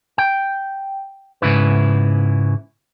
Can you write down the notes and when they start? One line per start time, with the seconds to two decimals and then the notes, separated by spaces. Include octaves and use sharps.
0.18 G5
1.42 G#2 C#3 E4 B4